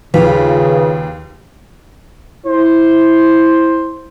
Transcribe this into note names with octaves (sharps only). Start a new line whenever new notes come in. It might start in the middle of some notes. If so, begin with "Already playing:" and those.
D#2 C#3 F4 B4 F5
E4 C5